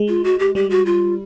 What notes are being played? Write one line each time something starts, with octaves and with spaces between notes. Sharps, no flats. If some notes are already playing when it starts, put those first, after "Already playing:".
Already playing: G#3
F4
F#4
G4
G3 G4
F#4
F4